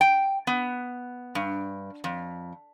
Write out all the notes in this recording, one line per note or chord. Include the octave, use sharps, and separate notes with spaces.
G5
B3
G2
F2